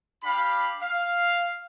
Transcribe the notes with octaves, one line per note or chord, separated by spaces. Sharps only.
D4 G4 F5 B5
F5